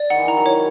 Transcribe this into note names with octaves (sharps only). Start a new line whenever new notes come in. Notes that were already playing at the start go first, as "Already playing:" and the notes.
Already playing: D5
D#3 F#5
E3
D#3 A#5
F#3
C#5